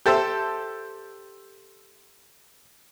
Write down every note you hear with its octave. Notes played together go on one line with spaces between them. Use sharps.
G4 A4 C5 E5